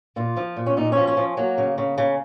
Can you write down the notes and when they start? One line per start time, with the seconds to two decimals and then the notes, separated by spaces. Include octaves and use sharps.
0.16 A#2 F4
0.37 F3
0.57 A#2
0.66 C#4
0.77 A#2 D#4
0.92 C#4
0.97 F3
1.07 C#4
1.17 F3
1.37 F#3 A#3
1.58 C#3
1.78 C#3
1.98 C#3